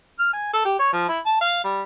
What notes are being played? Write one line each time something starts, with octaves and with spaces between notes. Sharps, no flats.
F6
G#5
A4
G4
C#5
F3
E4
A5
F5
G3